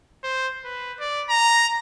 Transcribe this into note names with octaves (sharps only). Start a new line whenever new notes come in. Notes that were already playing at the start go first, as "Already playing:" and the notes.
C5
B4
D5
A#5